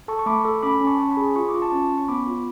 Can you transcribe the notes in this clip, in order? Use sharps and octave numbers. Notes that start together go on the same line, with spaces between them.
A4 A5 C#6
C#6
A3 B5 D6
A4
C#4 B5 D6
C#4
A5 C#6
C#4
G#5 B5
G#4
F4 C#6
D6
F4
A5 C#6
C#4
C#4
C#6
B3 B5 D6
F4